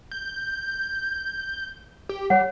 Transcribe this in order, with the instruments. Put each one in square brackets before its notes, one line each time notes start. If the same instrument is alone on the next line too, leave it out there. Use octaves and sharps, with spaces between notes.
[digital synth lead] G6
G4
[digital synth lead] G3 [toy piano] C#5 F#5